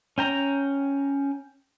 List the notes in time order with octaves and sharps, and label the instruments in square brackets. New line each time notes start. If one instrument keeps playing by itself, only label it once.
[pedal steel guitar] C#4 G5 A#5